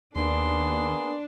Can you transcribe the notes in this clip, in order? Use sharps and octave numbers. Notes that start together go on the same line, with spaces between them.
D#2 A#3 B3 D4 G#4 C6